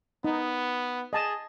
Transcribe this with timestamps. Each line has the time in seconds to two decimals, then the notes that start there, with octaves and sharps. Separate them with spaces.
0.24 B3 D#4
1.13 G#4 D#5 A5 D#6